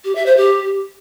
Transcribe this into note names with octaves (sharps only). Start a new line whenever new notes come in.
G4
E5
C5
G4